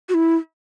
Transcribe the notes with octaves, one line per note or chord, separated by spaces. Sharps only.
F#4
E4